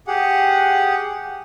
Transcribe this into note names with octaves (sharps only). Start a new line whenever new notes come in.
G4 G#4 F#5